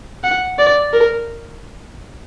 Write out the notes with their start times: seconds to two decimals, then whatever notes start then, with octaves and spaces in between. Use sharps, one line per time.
0.24 F#5
0.59 D5
0.93 A#4